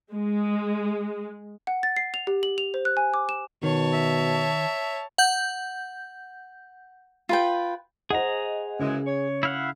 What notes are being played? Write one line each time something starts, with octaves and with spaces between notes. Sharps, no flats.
G#3
F#5
A6
C7
F7
G4
F#7
F7
C5
F#6
G#5
D6
E7
B2 D#3 C#5 A5
E5
F#5 G6
F4 B4 G5
G#4 C5 D#5 F#5 A#5
F#2 C#3 E3 G#3
C#5
E4 F5 F#5